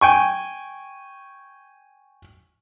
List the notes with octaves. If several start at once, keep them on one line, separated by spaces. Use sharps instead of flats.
G5 G#5 C#6